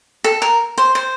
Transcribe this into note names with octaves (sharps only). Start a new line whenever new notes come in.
A4
A#4
C5
C5